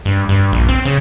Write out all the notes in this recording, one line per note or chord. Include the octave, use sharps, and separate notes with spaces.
G2
G2
A#1
C4
C#3